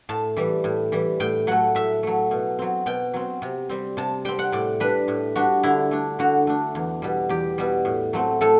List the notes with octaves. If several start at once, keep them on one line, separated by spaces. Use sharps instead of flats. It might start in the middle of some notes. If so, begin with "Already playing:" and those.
A2 A5
E3 G3
A2
E3 G3
A2 G5
F#3 A3 F#5
A2 E5
F#3 A3
B2
F#3 C4
B2 G5
F#3 C4
C3
G3 C4
C3 A5
G3 C4 G5
F#5
A2 D5
G3 D4 B4
A2
G3 D4 F#4
D3 E4
A3 D4
D3 F#4
A3 D4
E2
B2 G3
E2 G4
B2 G3
A2
F#3 A3 C4
A2 A4